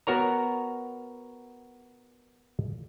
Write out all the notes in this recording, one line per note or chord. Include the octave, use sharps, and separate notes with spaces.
B3 F#4 A#4 C#5 A#5